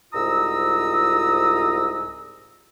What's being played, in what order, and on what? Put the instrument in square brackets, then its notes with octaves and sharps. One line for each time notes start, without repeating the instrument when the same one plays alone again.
[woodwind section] C2 G#2 F4 A#5 D#6 E6